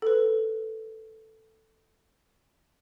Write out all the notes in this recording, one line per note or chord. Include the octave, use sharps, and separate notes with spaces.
A4 B4